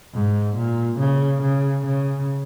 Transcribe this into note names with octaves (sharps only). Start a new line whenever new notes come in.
G#2
A#2
C#3
C#3
C#3